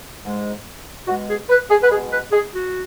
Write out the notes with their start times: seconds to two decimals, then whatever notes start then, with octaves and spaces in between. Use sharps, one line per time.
0.24 G#2 G#3
1.07 B2 G#3 F#4
1.28 G#4
1.49 B4
1.70 G#4
1.82 B4
1.91 G#3 G#4
1.95 B2
2.12 B4
2.32 G#4
2.53 F#4